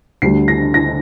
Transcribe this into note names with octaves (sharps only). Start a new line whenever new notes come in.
D2 D3 G3 C7
A#6
A#6